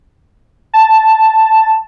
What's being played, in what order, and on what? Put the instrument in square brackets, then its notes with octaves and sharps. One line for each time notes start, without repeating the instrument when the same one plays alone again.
[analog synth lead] A5